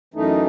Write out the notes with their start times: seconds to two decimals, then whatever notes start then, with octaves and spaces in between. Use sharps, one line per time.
0.14 F#2 E3 A3 D#4